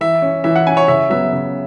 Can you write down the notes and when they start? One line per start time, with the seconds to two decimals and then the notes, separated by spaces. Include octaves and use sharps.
0.01 E3 E5
0.22 C#4
0.44 E3 E5
0.56 F#5
0.67 C#4 G#5
0.77 C#5
0.88 C#3 E5
1.10 F#3 B3 E5
1.32 C#3